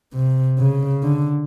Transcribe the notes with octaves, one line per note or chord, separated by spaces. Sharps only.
C3
C#3
D3